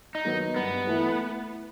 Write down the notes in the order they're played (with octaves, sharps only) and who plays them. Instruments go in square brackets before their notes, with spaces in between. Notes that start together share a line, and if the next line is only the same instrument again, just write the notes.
[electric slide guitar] D#4
[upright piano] D#3 F#3 B3
[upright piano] G2 [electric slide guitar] B3
[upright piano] E3 A3 E4